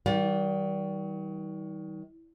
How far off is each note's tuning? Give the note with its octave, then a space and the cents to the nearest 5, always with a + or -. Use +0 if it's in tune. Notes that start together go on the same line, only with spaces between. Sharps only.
D#3 +40 G3 -25 F5 +45